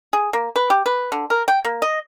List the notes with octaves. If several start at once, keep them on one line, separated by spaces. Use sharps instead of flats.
G#4
A#3
B4
G4
B4
D3
A#4
G5
A#3
D#5